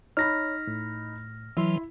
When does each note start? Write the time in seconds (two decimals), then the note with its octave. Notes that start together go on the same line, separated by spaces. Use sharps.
0.17 D#4 C#5 B5 F6 A#6
0.67 A2
1.57 E3 F#3 E4 E5 C6